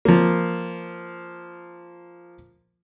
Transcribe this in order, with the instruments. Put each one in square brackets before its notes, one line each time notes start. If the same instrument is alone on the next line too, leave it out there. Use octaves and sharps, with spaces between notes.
[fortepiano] F3 A#3